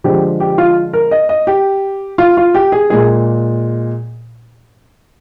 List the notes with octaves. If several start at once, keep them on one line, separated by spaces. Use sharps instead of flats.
D3 F3 G#3 G4
G4
F4
A#4
D#5
D#5
G4
F4
F4
G4
G#4
A#2 G#3 G#4